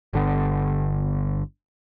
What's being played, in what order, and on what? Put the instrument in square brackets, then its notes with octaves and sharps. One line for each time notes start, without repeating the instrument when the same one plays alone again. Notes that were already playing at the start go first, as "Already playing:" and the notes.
[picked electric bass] G1 D3 B3